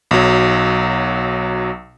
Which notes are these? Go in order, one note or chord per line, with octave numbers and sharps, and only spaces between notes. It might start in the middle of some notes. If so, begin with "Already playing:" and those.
B1 F#3